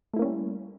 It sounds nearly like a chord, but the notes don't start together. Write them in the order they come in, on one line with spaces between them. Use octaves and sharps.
A3 E4 A#3 C#4 G3